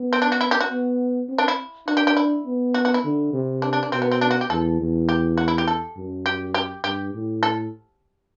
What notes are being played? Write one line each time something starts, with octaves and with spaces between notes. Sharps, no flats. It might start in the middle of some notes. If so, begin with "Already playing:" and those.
Already playing: B3
C4
D4
F#4
E4
G4
F#4
B3
C4
D4
E4
D4 F#4
G4
G4
E4
B3
F#4
F#4
E4
D3
C3
D4
D4
D4
B2 C4
B3
C4
D4
F#4
G4
E2 A4
E2
G4
F#4
E4
G4
A4
F#2
G4
G4
G2 G4
A2
A4